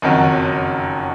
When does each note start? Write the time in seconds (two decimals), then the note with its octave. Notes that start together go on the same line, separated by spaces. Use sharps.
0.02 F#1 F2 D#3 F#3 C#4